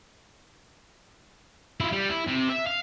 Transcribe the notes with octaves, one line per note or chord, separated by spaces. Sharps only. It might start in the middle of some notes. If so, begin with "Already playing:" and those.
E4 F4
G3
E4
C3
E5
F5